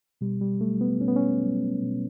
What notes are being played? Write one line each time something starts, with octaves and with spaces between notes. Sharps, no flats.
B2 G3
G3
F#3 A3
B3
B2 C#4
B3
C#4
F#3
B2